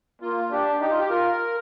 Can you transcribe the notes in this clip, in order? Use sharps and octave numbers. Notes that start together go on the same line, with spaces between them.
A#3 F4
D4 G4
D#4 G4
F4
G4
F4 A#4